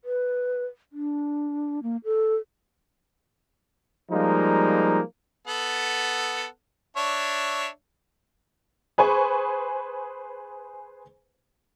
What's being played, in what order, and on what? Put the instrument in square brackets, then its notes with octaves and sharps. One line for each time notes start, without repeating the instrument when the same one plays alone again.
[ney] B4
D4
A#3
A4
[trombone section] F3 G3 G#3 A#3 D#4
[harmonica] B3 A4 F#5
D4 C#5 E5
[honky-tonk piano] G#4 B4 C5 G#5 C#6